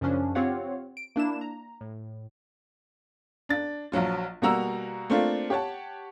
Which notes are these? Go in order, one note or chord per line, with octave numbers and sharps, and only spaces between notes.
F#2 C#3 F3 C#4 D4
C4 F4 G4 C#5 F5 F#5
D7
A#3 D4 E4 E7
A#5
A2
D4 A6
A#1 F3 F#3 F4
B2 G3 A#3 F#4 A#5 E6
A3 A#3 C4 D4 F4
G4 C#5 F#5 A5